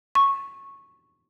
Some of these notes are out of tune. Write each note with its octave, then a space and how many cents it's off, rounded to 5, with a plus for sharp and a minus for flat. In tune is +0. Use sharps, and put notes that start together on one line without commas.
C#6 -10